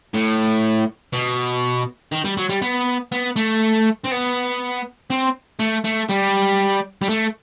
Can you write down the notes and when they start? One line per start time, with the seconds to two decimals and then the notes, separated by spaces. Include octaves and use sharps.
0.14 A2
1.13 B2
2.12 D#3
2.25 G3
2.37 F#3
2.49 G3
2.62 B3
3.12 B3
3.36 A3
4.04 C4
4.11 B3
5.10 C4
5.60 A3
5.85 A3
6.10 G3
7.02 G3
7.09 A3